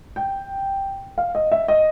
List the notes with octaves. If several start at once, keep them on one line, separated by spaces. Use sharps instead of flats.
G5
F5
D#5
E5
D#5